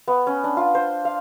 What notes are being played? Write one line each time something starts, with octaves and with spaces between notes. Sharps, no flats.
B3
C#4
D4
F4
C5
F5